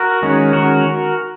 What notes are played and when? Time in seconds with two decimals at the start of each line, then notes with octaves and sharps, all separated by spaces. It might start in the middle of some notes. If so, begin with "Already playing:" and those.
Already playing: F#4 A#4
0.22 D#3 G#3 C#4
0.53 F#4 A#4